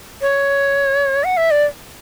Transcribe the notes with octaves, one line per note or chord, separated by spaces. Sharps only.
C#5
F#5
E5
D5